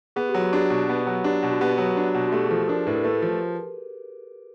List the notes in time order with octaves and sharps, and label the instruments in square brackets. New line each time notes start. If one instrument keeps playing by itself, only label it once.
[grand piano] B3 [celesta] G#4
[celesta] G4
[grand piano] F#3
[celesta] F#4
[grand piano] D4 [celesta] G4
[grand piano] B2
B3
F#3
[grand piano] D4 [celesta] G4
[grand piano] B2
[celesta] F#4
[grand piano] B3 [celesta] G4
[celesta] F#4
[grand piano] F#3
D4
B2
[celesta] F#4
[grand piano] A3 [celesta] G4
[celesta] G#4
[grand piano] F3 [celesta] A4
[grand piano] D4 [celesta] A#4
[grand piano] A2 [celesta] B4
[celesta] A#4
[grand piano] A3 [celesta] B4
[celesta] A#4
[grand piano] F3